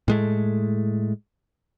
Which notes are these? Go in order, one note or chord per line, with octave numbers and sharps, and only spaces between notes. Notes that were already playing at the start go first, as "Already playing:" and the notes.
A2 G#3 A3